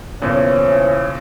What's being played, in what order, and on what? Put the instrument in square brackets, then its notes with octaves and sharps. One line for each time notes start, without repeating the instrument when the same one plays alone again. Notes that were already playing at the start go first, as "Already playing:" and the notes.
[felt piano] B1 A#2 C#3 [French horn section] E3 C5 C#5